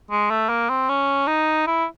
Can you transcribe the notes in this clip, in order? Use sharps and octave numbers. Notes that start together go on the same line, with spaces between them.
G#3
A3
A#3
C4
C#4
D#4
E4